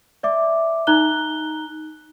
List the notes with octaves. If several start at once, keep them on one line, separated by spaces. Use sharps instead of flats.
D5 E5 D6
D#4 A#5 F#6 G7